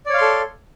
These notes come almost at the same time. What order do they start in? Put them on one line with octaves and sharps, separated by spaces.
D5 C#5 F5 C6 A4